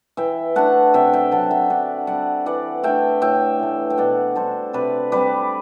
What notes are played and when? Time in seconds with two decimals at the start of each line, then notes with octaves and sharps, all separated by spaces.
0.17 E3 E5 G5
0.55 A3 D4 F#5 A5
0.94 C3 E5 G5
1.13 E5 G5
1.31 F#3 A3 C4 F#5 A5
1.51 E5 G5
1.70 D3 D5 F#5
2.07 G3 C4 D5 F#5
2.46 E3 D5 F#5
2.83 A3 D4 E5 G5
3.22 A2 E5 G5
3.59 E3 A3
3.90 G5
3.98 B2 D5 F#5
4.36 G3 D4 A4 C5
4.73 C3 B4 D5
5.12 G3 C4 B4 D5